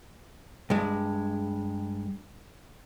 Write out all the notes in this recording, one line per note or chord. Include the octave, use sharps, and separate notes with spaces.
G2 G#3